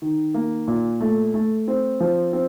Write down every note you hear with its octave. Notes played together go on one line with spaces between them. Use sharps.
D#3
A#3
A#2
A3
A3
C4
F3
C4